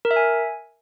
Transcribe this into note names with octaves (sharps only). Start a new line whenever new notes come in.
A#4
E5
G#5